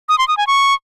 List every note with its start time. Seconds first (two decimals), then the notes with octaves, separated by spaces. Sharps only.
0.09 D#6
0.18 C6
0.28 D#6
0.37 G#5
0.47 C#6